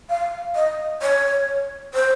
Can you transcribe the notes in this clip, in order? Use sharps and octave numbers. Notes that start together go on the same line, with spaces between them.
F5
D#5
C#5
C5